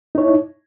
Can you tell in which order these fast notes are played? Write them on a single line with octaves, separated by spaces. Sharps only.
D#4 C#5 E4